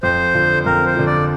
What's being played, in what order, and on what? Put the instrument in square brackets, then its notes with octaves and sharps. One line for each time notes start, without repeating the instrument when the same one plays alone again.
[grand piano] F2 [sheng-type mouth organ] C5
[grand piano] D3 F3
[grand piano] F2 [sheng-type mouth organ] A#4
[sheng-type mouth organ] C5
[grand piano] D3 F3
[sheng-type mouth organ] D5